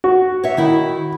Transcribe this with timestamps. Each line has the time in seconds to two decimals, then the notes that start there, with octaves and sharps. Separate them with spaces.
0.04 F#4
0.44 C#5 E5
0.57 D#3 E4